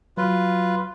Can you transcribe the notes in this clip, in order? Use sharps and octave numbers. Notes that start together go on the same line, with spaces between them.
F#3 F4 B4